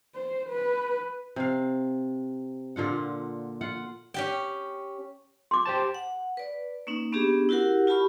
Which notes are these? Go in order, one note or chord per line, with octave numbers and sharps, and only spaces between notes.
C5
B4
C3 F5
A#2 D3 F4 F#5
F4 F#5
C#4 G4 G5
C6 D6
G4 C5 A5
F#5
B4 D5
A#3 C#4 D#4
B3 C#4 D4 G4 G#4
E4 F#4 G4 A#4 F#5
F4 G4 A5 B5 C#6